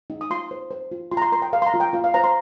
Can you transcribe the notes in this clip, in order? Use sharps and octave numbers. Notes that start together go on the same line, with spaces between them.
D#4
D#6
F4 C6
C5
C5
F4
F4 C6
A#5
C6
A#4 C6
G5
A#4 F5
C6
A#5
F4
G5
F4 F5
F5
C5 A#5
C6